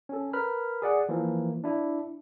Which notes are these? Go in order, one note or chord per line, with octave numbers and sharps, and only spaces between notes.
C#4 A4
A#4 B4 B5 F6
G#4 D5 F#5
E3 F3 A#3
D4 E4